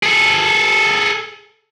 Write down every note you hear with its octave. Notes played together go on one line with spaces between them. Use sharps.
G#4 A4